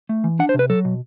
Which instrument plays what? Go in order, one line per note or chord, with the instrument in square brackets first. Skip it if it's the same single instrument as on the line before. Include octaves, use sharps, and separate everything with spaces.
[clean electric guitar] A3
E3
D4 F#5
C5
C3 B4
F#3 A4
B2